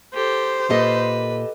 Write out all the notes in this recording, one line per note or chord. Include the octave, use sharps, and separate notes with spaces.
G4 A4 C5
A#2 G4 A4 B4 D#5